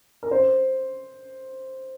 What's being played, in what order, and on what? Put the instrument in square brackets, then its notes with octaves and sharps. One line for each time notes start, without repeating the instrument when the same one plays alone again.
[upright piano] A#4
C5